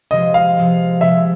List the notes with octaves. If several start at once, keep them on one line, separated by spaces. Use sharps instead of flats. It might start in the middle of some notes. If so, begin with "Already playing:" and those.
C3 F3 G#3 D#5
F5
C3 F3 G#3
C3 F3 G#3 E5